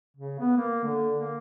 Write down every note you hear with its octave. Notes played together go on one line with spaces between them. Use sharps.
C#3
B3
A#3
D3
A#3